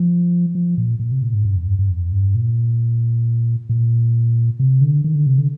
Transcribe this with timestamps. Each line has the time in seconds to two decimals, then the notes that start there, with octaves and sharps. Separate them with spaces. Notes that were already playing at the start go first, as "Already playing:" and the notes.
Already playing: F3
0.55 F3
0.78 A#2
0.99 A#2
1.12 C3
1.22 A#2
1.33 G#2
1.45 G2
1.56 F2
1.67 G2
1.79 G2
1.90 F2
2.12 G2
2.35 A#2
3.69 A#2
4.60 C3
4.81 D3
5.04 D#3
5.15 D3
5.26 C3
5.38 D3